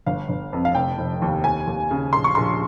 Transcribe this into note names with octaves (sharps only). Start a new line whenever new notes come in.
G1 F5
G1
F2
F5
F1 G5
F1
D#2
D#2 G#5
D#2
C#3
A#1 C6
C#6
A#1 C6